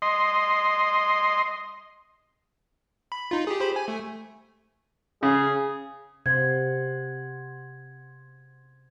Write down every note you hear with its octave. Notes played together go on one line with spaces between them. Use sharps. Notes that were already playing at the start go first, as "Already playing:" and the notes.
D#5 C6
B5
D#4 F4
G4 G#4
G4 C5 B5
G#5
A3
C#3 G#4
C3 C5 F#5 G#6